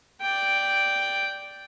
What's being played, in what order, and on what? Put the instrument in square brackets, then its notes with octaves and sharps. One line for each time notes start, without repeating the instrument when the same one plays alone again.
[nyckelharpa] D5 G5